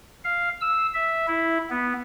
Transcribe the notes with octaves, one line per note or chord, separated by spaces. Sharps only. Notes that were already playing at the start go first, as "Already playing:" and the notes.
F5
E6
E5
E4
B3